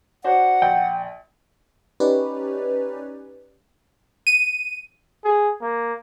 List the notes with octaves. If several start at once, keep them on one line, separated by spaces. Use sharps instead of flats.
D4 F#4 C5 F#5
A#1 G5
C#4 D#4 G4 B4 C#5 D5
D#7
G#4
A#3